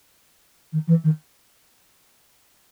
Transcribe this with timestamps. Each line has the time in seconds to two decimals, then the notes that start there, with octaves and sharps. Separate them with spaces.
0.73 D#3
0.88 E3
1.04 D#3